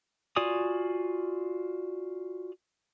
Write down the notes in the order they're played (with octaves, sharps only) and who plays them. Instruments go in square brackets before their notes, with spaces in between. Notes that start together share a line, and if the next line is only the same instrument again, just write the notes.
[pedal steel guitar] F4 F#4 D5 G#5 D#6